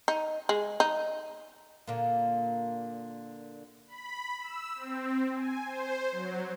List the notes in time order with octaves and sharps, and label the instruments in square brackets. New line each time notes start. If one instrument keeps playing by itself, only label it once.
[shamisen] D#4
G#3
D#4
[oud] A#2 D3 A#3
[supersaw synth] B5
E6
C4
G#5
C5
F#3